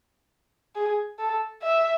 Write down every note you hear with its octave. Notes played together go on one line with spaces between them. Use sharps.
G#4
A4
E5